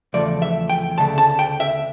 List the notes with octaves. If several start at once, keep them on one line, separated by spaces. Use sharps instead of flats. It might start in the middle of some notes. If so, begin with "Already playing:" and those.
E2 C#3 F3 A3 D5
E5
G5
D2 C#3 A3 A5
A5
G5
E5